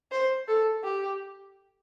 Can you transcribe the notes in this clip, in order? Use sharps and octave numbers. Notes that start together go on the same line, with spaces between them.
C5
A4
G4